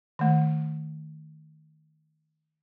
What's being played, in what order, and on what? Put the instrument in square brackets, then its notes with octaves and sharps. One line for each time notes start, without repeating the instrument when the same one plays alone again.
[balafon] D#3 A3